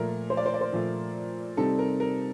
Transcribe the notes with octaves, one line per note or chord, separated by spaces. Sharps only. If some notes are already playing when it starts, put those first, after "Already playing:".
Already playing: A#2 F3 A3 A#4
C5
D5
C5
D5
C5
A#2 F3 A3
C3 G3 C4 D#4 A4
A#4
A#4